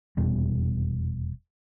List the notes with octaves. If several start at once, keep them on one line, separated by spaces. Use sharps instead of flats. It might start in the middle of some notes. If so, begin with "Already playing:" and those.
F1 E2 B2 G3